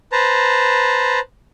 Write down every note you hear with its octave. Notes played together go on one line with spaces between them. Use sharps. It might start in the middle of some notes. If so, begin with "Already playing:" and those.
B4 C5 A5 A#5